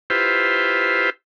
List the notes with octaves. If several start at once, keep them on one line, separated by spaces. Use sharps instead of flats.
E4 F4 G4 B4 C5